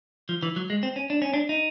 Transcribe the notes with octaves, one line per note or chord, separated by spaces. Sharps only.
F3
E3
F#3
G#3
C4
C#4
D4
C#4
D4
D#4